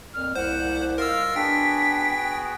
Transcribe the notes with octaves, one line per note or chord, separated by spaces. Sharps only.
F2 A#2 F6
C2 C5 F#5
F4 A#4 D#5 F5 E6
B3 D4 F#4 G#4 G5 B6